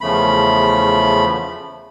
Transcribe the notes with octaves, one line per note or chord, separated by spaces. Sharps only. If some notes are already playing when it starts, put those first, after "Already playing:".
E2 C#3 F3 A3 B5